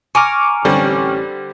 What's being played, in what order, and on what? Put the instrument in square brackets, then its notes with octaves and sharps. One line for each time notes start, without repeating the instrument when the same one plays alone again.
[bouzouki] G#5 A#5 [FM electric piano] C#6 D6 F6
[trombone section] A1 C#4 G4 [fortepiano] D3 G3 C4